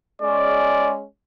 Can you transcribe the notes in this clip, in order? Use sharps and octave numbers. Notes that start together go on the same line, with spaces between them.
G#3 C#4 D5